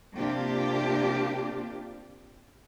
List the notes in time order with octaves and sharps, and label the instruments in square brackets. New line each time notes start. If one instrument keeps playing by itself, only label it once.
[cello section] C3 A#3 D4 F4 G4